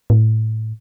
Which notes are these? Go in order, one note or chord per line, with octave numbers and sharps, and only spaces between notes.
A2